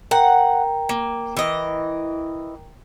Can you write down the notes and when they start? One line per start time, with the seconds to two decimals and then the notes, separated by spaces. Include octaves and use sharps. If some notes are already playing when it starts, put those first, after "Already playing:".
0.11 A#4 F#5 G5 A#5
0.89 A#3
1.37 E3 D#5